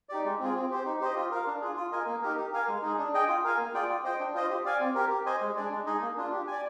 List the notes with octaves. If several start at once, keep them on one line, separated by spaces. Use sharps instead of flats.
D#4 G4 D5
G#3
C4 F4 G#4
C4
G4 C5
D#4
G4 C5 D#5
F4
A#4 F5
D4
F4 G#4
F4
A#4 D#5 G#5
A#3
D#4 G4 A#4
G4
A#4 F5 G#5
G#3
D#4 G#4
D4
G#4 D#5 G5
F4
A#4 F5 G#5
A#3
F4 G#4 D5 G5
F4
C5 D#5 G5
D4
F4 C5 D#5
G4
D5 F5 G#5
C4
G4 A#4
G4
C5 D#5 G#5
G#3
D4 G#4 D5
G#3
D#4 G#4 D#5
A#3
D4 F4
G4
D5 G#5